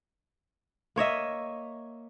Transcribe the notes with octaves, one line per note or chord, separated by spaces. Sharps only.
A#3 C#5 D#5 E5